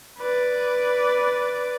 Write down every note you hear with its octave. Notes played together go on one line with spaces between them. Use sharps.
B4 D5